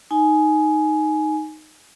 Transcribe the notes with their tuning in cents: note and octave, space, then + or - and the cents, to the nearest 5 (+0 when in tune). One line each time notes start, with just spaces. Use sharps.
D#4 +0 G#5 +15